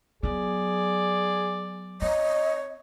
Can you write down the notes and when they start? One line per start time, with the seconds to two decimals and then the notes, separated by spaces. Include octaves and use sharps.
0.23 F#3 B3 G#4 D5
2.02 C4 C#5 D#5